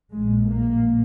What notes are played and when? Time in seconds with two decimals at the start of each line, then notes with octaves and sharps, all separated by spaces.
0.13 A#1 A#2 G#3
0.50 A#3